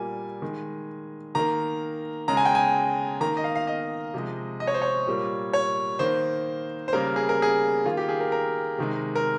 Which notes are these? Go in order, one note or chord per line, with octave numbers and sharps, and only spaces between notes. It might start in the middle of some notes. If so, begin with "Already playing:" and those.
Already playing: A#2 G3 A#3 G#5
D#3 G#3
D#3 A#3 A#5
C#3 G#3 A#5
G#5
G5
G#5
D#3 A#3 A#5
D#5
F5
F5
D#5
C3 F3 G#3
D#5
C#5
C5
C#5
A#2 G3 A#3
C#5
D#3 A#3 C5
C5
C#3 G3 A#3 A#4
G#4
A#4
G#4
D#3 A#3 F4
G4
G#4
A#4
A#4
C3 D#3 G#3
A#4